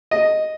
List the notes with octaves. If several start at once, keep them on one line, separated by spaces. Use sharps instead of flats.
D#5